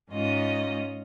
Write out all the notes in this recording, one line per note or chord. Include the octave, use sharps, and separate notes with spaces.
G#2 C#4 F4 D#5